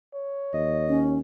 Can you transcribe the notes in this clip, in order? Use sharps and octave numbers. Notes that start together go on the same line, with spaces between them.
C#5
D#2 D#5
C#4